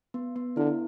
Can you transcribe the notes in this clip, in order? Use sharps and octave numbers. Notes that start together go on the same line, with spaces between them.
B3
B3
D3 E4